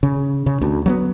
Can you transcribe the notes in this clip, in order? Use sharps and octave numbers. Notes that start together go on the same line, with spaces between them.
C#3
C#3
D2
F#3 A#3 B3